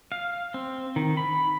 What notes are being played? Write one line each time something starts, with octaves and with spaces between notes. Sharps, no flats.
F5
C4
D#3
B5